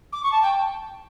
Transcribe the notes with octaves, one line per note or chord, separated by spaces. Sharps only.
D6
C#6
A5
G5